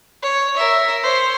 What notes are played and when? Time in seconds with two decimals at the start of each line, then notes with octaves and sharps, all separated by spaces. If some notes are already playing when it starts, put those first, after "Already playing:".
0.22 C#5
0.56 A#4 E5
1.03 C5 C#5